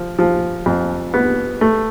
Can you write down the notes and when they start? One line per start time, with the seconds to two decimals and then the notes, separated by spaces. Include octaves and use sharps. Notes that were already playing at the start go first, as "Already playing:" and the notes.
Already playing: F3
0.19 F3
0.66 F2
1.14 B3
1.61 A3